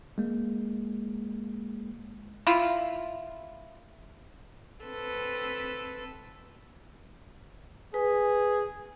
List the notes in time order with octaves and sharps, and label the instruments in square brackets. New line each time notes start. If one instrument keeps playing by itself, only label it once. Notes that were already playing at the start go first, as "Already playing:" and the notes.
[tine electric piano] G#3 A#3
[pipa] E4 F4
[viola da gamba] C4 A4 B4
[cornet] G#4 [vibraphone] B4